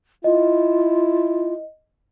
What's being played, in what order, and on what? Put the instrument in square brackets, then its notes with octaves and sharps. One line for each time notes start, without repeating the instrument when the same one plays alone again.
[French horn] E4 [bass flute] F4 [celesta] D#5